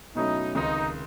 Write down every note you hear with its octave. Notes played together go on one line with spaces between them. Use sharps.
B2 F#3 A3 C#4 D#4 E4
C#2 C3 D#3 D#4